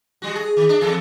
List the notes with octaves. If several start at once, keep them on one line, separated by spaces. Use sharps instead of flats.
G3 F#4
G#4
D#3
D4
E2 G#4 A4